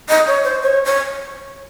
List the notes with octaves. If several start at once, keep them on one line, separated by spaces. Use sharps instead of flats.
D#5
C#5
C5
C#5
C#5